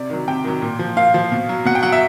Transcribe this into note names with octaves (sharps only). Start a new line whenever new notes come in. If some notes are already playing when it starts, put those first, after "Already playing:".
Already playing: C3 D5
D#3 F#3
C3 G5
D#3 F#3
A#2
F3
A#2 F5
F3
B2
F#3
B2 F#5
G5
F#3 F#5
E5